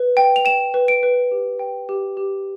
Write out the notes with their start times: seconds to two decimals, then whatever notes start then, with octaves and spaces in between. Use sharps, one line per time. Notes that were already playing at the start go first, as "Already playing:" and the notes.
Already playing: B4
0.17 G5
0.36 F7
0.45 G5 E7
0.74 B4
0.88 D7
1.03 B4
1.31 G4
1.59 G5
1.89 G4
2.17 G4